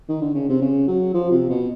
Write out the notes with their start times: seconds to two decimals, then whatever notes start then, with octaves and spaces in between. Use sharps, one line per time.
0.09 D#3
0.22 D3
0.34 C#3
0.49 C3
0.62 C#3
0.88 F#3
1.14 F3
1.31 C3
1.49 B2